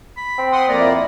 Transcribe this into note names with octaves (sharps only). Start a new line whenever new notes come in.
B5
C4
F#5 C6 D#6
F2 A#3 D5 A#5
E4